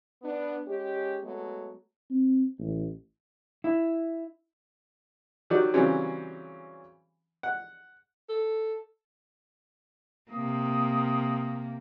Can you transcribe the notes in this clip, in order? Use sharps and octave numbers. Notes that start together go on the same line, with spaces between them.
B3 D4
G#3 C#4 G4
F#3 G#3 A3 B3
C4
A1
E4
D#3 F#3 F#4 G4 D5
C#3 E3 F#3 G3 C4 C#4
F#5
A4
C3 A#3 D#6